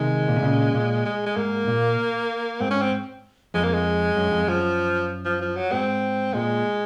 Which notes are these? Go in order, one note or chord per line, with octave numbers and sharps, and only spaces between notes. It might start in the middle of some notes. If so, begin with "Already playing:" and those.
Already playing: C3 D#3 G#3
A#2
C3
A#2 C#3
A#2
G#3
G#3
G#2 A#3
A#2
G#2 C4
C#4
C4
F2 G#3
A#3
G#3
F#2
F2
F#2 F3
F3
F3
F#3
G#2 C4
A#2 G#3